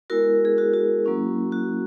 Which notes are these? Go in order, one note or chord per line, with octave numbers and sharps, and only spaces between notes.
G#3 B3 E4 F#4 A#4
G#4
F#4
F#4
F#3 A#3 C#4 E4
F#4